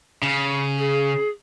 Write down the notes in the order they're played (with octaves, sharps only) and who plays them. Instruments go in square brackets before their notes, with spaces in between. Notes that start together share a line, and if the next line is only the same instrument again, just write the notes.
[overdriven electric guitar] C#3
[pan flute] G#4